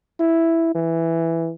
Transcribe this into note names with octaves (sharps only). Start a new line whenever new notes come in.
E4
E3